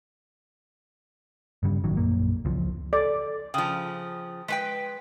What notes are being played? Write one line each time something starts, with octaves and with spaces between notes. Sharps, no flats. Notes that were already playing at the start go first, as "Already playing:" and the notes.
G2 C#3 G3
A1 D#3 F#3
A#1 F#2 A#3
C#2 E3 F3
A4 D5
C#3 F3 G5 D#6
G#3 B4 G5 B6